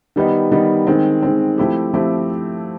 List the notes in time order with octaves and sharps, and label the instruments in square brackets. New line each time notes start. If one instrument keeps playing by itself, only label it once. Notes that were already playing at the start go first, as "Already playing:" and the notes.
[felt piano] D#3 G3 B3 D#4
D#3 G3 B3 D#4
D#3 G#3 C4
D#3 G#3 C4
F3 A3 C4 E4 G4
F3 A3 C4 E4 G4